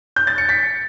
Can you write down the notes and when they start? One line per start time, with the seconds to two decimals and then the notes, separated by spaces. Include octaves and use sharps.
0.16 G6
0.27 A6
0.38 C#7
0.49 B6